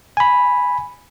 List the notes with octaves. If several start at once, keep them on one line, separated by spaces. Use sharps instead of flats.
G#5 B5